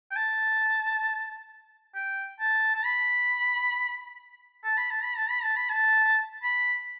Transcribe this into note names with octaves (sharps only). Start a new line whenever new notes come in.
G5
A5
G5
A5
A5
B5
A5
B5
A5
B5
A5
B5
A5
B5
A5
B5